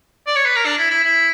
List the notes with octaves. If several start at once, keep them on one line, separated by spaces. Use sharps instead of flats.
D5
C#5
B4
A#4
D4
E4
E4
E4